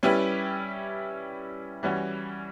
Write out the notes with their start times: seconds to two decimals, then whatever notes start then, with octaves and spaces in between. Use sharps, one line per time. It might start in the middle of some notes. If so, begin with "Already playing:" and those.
0.03 G3 C#4 E4 G4 B4
1.83 E3 G3 C#4 F#4